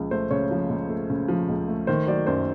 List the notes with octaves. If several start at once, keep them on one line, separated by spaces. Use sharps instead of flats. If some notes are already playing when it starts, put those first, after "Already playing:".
Already playing: C#2 C#3 F3
A3 C5
C#3 C#5
F3
C#2
A3
C#3
F3
C#2
A3
D#3 C5
F#3 D5
F#2 C5